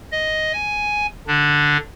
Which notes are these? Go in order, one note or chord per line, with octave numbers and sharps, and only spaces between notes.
D#5
G#5
D3 D4